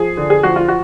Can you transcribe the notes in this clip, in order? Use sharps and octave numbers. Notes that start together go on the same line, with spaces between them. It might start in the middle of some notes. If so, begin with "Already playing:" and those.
Already playing: F3 G#4
D3
G#4
F3 F#4
F4
F#4